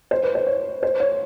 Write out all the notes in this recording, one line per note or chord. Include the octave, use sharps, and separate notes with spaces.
C5
B4
C5
C#5
C5
C#5